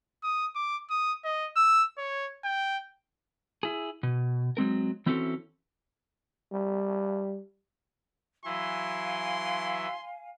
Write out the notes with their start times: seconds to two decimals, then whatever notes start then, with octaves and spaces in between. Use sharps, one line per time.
0.24 D#6
0.55 D6
0.90 D#6
1.24 D#5
1.56 E6
1.98 C#5
2.44 G5
3.63 E4 G#4
4.03 B2
4.57 F#3 G#3 C4 A#4
5.06 E3 C4 C#4 E4 F#4 A4
6.52 G3
8.45 E3 F#3 E4 F5 G#5 C6